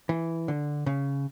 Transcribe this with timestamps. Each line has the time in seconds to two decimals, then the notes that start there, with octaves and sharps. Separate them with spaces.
0.09 E3
0.48 D3
0.86 C#3